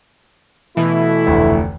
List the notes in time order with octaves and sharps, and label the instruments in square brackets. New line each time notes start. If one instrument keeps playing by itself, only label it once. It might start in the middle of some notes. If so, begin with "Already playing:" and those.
[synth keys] B2 E3 [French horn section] A3 E4
[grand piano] F1 D2